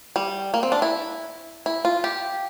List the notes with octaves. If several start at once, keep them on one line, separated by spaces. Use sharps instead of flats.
G3
A#3
C4
D4
E4
E4
F4
G4